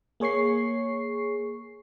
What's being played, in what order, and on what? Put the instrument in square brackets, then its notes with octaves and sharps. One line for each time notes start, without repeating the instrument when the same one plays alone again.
[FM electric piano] A#3 G#4 C#5 C#6 C7